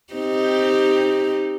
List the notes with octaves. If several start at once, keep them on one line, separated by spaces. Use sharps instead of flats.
C4 D#4 G4